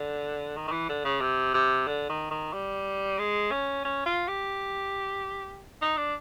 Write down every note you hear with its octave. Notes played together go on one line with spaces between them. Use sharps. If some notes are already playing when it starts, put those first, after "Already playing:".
Already playing: D3
D#3
D#3
E3
D3
C#3
C3
C3
D3
D#3
D#3
G3
G#3
C#4
C#4
F4
G4
D#4
D4